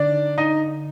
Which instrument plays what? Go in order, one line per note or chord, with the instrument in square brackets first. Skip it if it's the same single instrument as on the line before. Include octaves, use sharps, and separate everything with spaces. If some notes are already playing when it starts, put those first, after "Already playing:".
Already playing: [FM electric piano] D3 D#4 [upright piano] D4 D5
[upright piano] D#4 D#5